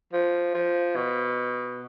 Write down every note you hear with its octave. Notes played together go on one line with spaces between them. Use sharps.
F3
F3
B2